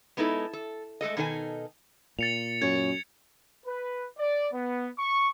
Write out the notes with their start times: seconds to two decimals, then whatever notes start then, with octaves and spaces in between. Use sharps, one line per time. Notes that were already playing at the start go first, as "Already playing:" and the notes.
0.17 G#3 B3 D#4 E4 A4
0.53 A4
1.01 G#3 A3 A4 D#5
1.17 B2 D#3 D#4 A4 C5 G#5
2.19 A#2 A6 C#7 F7
2.62 F#2 C#5 G#6
3.66 B4
4.18 D5
4.54 B3
4.98 C#6